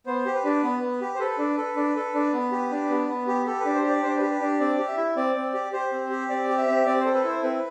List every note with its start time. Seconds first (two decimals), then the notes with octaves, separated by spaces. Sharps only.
0.06 B3 C5
0.26 G4
0.35 B4
0.44 D4
0.63 B3
0.82 B3
1.01 G4
1.15 C5
1.20 A4 B4
1.38 D4
1.57 A4
1.76 D4
1.96 A4
2.15 D4
2.33 B3
2.52 G4
2.71 D4
2.89 B3
3.09 B3
3.28 G4
3.46 G4 A4
3.60 D4 B4
3.75 C5
3.84 G4 D5
4.03 D4 C5
4.17 G4 B4
4.31 B4
4.41 D4
4.60 C4 D5
4.79 G4
4.88 E5
4.97 E4
5.16 C4 D5
5.35 C4
5.54 G4
5.73 G4 C5
5.92 C4
6.11 G4
6.29 C4 D5
6.49 G4
6.58 E5
6.67 C4
6.86 C4 D5
7.00 A4 C5
7.14 B4
7.24 E4 C5
7.43 C4 B4